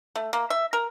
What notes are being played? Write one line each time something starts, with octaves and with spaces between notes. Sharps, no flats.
A3
A#3
E5
A#4